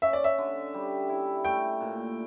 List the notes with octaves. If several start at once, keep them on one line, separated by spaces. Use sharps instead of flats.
C#4 E5
D5
E5
D3
G3
E4
A3 G5
A#2